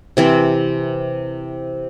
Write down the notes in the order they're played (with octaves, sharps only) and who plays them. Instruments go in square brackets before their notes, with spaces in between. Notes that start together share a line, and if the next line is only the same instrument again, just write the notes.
[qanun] C3 E3 C4